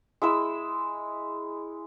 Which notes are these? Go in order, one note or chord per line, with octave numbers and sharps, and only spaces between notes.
G#3 E4 E6